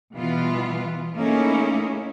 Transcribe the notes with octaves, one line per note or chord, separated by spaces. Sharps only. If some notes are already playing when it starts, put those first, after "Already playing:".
B2 E3 G3 B3 F4
A3 A#3 C#4 D#4 E4 G#4